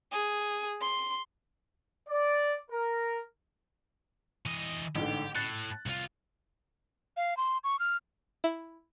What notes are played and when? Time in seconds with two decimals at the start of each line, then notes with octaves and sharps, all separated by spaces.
0.12 G#4
0.81 C6
2.07 D5
2.69 A#4
4.46 E3 D#5
4.96 A1 G#2 D3 G4
5.35 A2 F#6 A6
5.86 C2 F4
7.17 F5
7.37 C6
7.64 C#6
7.79 F6
8.44 E4